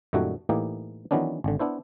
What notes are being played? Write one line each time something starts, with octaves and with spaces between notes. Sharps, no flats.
F#2 A#2 D#3 G3 A3 F#4
A2 E3 A#3 D#4 G4
D#3 E3 F#3 B3 C#4 D4
G#1 D3
B3 D4 E4 C5